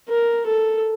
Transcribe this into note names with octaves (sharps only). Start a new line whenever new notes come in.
A#4
A4